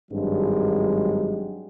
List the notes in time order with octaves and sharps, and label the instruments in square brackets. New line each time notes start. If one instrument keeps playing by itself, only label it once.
[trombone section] G#1 G2 F#3 G#3 G4